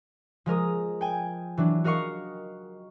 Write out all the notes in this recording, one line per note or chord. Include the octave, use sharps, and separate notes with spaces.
F3 G#3 A#4 D#6
G5 G#5
E3 F#3 D4
F#4 A#4 D#5 F5 C#6